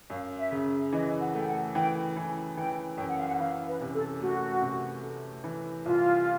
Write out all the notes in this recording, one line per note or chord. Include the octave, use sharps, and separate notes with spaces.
F#2 F5
E5
C#3
E3 D#5
F#5
A3 G5
F#5
E3 G5
E3 G#5
E3 G5
F#2 G5
F#5
F5
F#5
E3 F5
B4
C3
A4
A3 F#4
C3
A3
E3
C2 F4